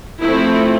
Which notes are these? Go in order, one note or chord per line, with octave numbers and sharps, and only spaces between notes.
F3 A3 C4 E4